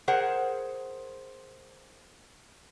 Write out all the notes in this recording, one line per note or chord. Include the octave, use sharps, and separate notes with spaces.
G#4 A#4 C5 F#5